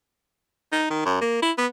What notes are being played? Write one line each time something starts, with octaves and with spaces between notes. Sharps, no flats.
D#4
D#3
F#2
A#3
E4
B3